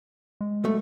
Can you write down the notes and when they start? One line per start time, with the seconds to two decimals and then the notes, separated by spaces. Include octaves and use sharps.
0.41 G#3
0.64 B1 A3